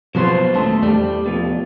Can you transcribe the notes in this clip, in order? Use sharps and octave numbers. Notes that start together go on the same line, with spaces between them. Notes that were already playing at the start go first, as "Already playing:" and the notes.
B2 F3 F#3 B3 F#4 C5
D#1 D3 A3 A5
E2 G3 A3
B2 F3